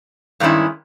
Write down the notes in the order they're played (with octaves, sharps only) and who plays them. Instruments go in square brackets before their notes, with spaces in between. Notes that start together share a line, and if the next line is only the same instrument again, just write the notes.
[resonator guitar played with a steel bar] G2 D#3 G#3 C#4 E4